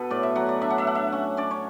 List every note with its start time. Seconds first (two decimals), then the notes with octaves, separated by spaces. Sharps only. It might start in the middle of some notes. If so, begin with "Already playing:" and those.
Already playing: B2 A4 B4
0.10 A2 D5
0.23 E5
0.35 F#3 F#5
0.49 D5
0.61 D4 E5
0.70 F#5
0.78 E5
0.87 D4 F#5
0.95 E5
1.12 C#4 F#5
1.37 C#4 D5
1.51 C#5